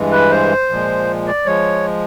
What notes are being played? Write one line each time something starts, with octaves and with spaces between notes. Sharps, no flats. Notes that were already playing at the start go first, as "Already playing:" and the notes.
Already playing: G2 E3 G#3
B4
C5
A#2 F3 G#3
D5
F3 G#3 C#5